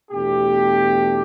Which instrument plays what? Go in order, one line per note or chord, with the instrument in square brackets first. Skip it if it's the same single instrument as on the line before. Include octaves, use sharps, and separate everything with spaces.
[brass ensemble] E2 B2 A3 D4 G4